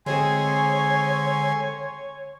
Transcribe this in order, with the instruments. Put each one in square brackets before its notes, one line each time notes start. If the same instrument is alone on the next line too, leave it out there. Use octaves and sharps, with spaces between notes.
[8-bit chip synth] D3 [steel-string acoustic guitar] G#3 C4 G#4 [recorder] C#5 [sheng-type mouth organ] G#5 C6